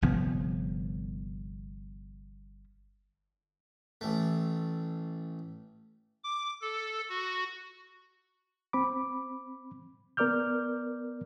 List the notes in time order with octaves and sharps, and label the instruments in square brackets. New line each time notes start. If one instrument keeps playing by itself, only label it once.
[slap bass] G1 C3 F3 B3
[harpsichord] A1 A3
[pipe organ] D6
A4
F#4
[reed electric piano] C4 B5 D6
B3 A#4 D5 D6 F6 G6